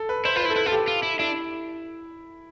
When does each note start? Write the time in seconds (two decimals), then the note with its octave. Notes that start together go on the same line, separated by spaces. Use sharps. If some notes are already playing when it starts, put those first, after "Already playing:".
Already playing: A4
0.09 B4
0.25 E4 C5
0.36 F4 B4
0.41 E4 C5
0.50 A4
0.56 E4 B4
0.66 F4 A4
0.72 G4
0.88 F4
1.03 E4
1.19 D4 E4